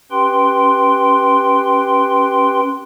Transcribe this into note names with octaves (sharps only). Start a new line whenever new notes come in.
C#4 G4 B4 G5 C6